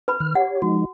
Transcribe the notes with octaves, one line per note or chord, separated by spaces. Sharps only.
B4 B5
D#3 F6
G4 C#5 F#5
F3 G#3 D#4 F#4